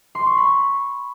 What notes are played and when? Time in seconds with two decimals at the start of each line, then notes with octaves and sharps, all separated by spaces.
0.15 C6
0.26 C#6
0.38 B5